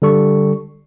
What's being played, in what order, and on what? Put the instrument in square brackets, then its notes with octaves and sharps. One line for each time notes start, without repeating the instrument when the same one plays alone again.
[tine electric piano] D3 G3 A4 C#6